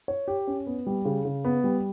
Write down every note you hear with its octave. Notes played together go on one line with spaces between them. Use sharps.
C#5
G4
C#4
B3
G3
C#3
C#3
B3
G3